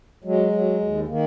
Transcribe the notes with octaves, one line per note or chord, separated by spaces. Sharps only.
F#3 G#3
F#3
D#2
D#3 A#3